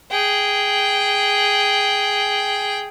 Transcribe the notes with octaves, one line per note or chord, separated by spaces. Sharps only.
G#4 G5